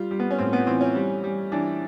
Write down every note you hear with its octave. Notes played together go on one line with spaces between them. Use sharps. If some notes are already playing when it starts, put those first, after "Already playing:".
Already playing: G3 F4
G3
B3
C#4
A2 C4
B3
E3 C4
C#4
G3
G3
E3 D4